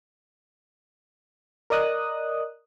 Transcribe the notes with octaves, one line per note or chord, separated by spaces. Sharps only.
A#4 D5 D#5 D#6 F#6